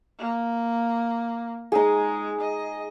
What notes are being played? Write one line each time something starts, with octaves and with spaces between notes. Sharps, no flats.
A#3
G#3 D#4 G#4
D#5